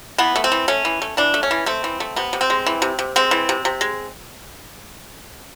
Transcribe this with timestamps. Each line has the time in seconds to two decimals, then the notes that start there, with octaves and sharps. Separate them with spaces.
0.18 E3 B3
0.36 A3
0.44 C4
0.52 E3
0.68 A3 C#4
0.85 E3
1.02 A3
1.17 E3 D4
1.34 A3
1.43 C#4
1.51 E3
1.66 A3 C4
1.84 E3
2.00 A3
2.16 C3 B3
2.33 C3
2.41 C4
2.50 G#3
2.67 E3
2.82 C3
2.99 C3
3.16 G#3 C4
3.31 E3
3.49 C3
3.65 C3
3.81 G#3